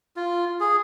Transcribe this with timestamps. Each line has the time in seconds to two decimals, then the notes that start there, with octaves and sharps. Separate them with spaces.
0.16 F4
0.60 G#4